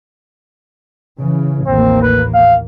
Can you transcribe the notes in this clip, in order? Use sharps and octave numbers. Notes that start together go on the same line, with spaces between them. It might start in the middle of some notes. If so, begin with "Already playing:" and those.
C#3 E3
A1 D#2 A#3 C4
B4
F5